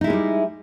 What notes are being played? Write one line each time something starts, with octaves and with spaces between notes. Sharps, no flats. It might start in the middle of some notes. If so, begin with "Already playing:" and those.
G3 G#3 C#4 D#4 E4